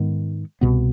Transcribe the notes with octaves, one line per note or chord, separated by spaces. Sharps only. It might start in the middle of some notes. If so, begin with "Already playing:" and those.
Already playing: G#2 D#3 G#3 B3
C2 B2 B3